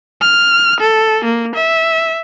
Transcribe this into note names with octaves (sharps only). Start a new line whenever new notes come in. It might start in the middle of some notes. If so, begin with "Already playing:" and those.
F6
A4
A#3
E5